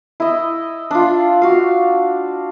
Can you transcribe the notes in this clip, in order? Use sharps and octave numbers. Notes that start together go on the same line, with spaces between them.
E4 D#5
D4 F4
F#4 F5